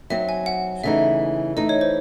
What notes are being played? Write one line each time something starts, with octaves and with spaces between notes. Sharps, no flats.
F#3 C4 D#4 E5
G#5
F#5
C#3 E3 A3 D#4 E5
E3 A3 D#4 D#5
C#5
C5